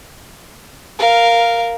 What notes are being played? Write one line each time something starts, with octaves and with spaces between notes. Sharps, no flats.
A#4 F5